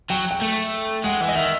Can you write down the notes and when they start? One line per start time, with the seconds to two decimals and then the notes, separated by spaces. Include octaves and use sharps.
0.10 F#3 G5
0.31 G5
0.41 A3
1.04 G#3 F#5
1.21 E3
1.28 D#5
1.35 D#3 E5